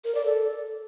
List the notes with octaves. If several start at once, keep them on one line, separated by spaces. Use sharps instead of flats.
A#4
D5
A4